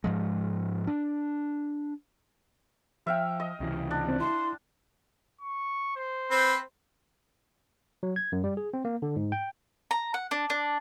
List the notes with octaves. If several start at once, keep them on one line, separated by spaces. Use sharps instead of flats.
G#2 F3 G#3
D4
F3 E5 F5 G5
D#5
C#2 C3 E3
D4
C4 D5
E4 C6
C#6
C5
C4 B4
F#3
G#6
F#2
G3
G#4
C4
A#3
D3
G#2
G5
A#5
F#5
D4
D4